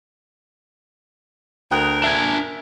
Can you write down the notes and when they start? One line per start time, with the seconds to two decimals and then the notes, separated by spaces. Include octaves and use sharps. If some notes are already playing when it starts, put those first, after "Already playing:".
1.71 D2 A#4 G5 D#6 F#6
2.04 D4 E5 G#5